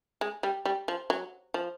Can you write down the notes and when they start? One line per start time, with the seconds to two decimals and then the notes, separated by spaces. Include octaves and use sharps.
0.21 G#3
0.43 G3
0.65 G3
0.88 F3
1.10 F#3
1.54 F3